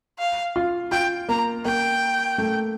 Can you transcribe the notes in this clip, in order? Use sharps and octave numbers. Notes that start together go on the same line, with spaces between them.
F5
F4
F4 G5
A#3 A#5
A#3 G5
A3